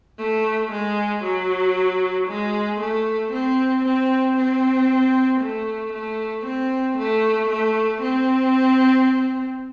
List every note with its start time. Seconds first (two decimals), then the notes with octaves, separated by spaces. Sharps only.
0.19 A3
0.72 G#3
1.24 F#3
2.28 G#3
2.81 A3
3.33 C4
3.85 C4
4.37 C4
5.42 A3
5.93 A3
6.46 C4
6.98 A3
7.50 A3
8.02 C4